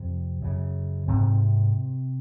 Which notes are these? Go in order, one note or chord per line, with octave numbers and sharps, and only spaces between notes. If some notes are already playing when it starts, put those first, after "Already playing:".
Already playing: F2 C3
F#2 C#3
G#2 C3 C4